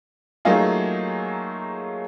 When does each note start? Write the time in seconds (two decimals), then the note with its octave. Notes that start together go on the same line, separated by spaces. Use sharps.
0.45 F#3 A3 A#3 D#4 F4 G#4